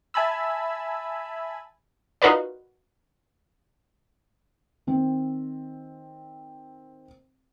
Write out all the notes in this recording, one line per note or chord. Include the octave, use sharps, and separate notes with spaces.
E5 G#5 A5 B5 E6
D#4 F4 F#4 A#4 B4 D5
D#3 C4